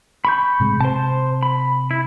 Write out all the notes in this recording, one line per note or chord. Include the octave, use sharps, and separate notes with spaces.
B5 C#6 G6
A2 C3 G#3
C3 C5 A5
B5
E4